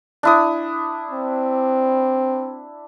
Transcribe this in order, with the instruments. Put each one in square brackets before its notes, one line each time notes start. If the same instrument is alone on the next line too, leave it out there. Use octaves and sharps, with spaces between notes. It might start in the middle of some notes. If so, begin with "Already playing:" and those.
[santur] D4 E4 D#6
[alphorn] C4